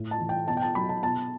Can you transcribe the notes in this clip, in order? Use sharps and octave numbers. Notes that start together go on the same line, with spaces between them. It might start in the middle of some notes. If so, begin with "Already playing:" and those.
Already playing: A2
A5
E3
G5
B2 A5
G5
A5
F#3 B5
A5
B2 A5